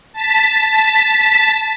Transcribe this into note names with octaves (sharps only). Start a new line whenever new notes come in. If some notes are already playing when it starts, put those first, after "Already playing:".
A5 B6